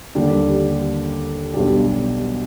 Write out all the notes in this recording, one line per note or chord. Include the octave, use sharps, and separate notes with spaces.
D#2 D3 G3 D4 G4
B1 B2 G3 D4 G4